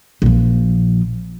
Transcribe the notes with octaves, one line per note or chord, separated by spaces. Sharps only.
A#1 F3